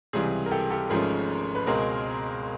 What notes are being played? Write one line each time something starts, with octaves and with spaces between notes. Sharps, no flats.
C#2 C3 E3 G3 G#4
A#4
G4 A4
G4 A4
G#1 G#2 F3 A3 C#4 G#4 A#4
B4
C#2 B2 G#3 C4 G#4 A#4